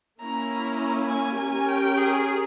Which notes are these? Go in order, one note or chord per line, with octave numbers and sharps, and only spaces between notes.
A#3 C#4 E4 A#5
G#5
C#4 G4 A#4 G#5
G5
G#4